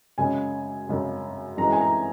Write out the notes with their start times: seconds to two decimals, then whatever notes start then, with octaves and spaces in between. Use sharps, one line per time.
0.18 F#2 C#3 G#3 G#5
0.87 F#2 C#3 G#3
1.57 F#2 E3 G#3 A#5
1.72 G#5
1.81 A#5